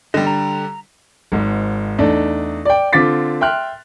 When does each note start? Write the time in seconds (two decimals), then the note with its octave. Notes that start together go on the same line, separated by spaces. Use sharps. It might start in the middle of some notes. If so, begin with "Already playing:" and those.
0.14 D3 G3 D#5
0.27 A#5
1.32 G#1 G#2
1.98 E2 A3 D4 D#4
2.65 D5 G5
2.93 D3 C4 F4 D6 A6 B6
3.41 E5 G5 C6 F6 F#6